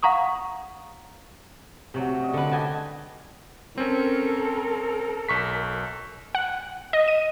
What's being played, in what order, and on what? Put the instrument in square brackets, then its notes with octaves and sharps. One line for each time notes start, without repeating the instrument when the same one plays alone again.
[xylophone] F5 F#5 A#5 C#6 D#6
[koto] C3 F#3 [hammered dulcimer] A3 F#4 G#4
[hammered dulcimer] C#3 D5 D#5
[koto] D3 B4
[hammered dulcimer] G4 F#5 [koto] D#5 G#5 A5
[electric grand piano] C4 C#4 [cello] A4 A#4
[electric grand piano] B1 C#6 B6
[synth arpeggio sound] F#5
D#5
D#7